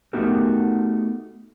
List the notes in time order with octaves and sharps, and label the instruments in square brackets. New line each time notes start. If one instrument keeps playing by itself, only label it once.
[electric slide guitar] A3 B3 D#4 F#4 G4 A#4